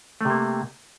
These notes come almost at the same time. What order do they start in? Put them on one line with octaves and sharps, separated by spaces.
A3 C3 A#3